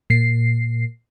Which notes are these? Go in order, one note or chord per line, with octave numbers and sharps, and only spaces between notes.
A#2 C7